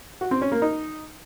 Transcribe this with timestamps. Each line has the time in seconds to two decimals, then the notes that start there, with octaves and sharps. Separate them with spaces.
0.21 F#4
0.31 C4
0.41 C#4
0.52 A#3
0.62 D#4